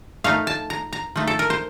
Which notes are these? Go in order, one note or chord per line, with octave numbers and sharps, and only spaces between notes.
F3 A3 D#4 F5
A5
A#5
A#5
F3 A3 D#4
A4
A#4
C5